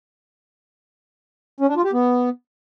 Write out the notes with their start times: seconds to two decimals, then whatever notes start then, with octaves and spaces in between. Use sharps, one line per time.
1.60 C#4
1.68 D4
1.77 F4
1.85 G4
1.93 B3